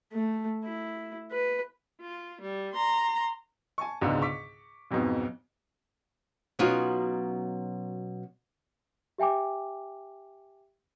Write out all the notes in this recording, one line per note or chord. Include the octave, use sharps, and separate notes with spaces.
A3
E4
B4
F4
G3
A#5 C6
G#5 A5 C#6
C#2 G#2 B2 D3
C#6 D6 B6
B1 F2 G#2 B2
B2 F#3 C#4 D#4 F4 F#4
G4 E5 G5 G#5 D6